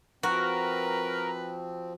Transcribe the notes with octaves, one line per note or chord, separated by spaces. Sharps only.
F3 C4 F#4 A#4 B4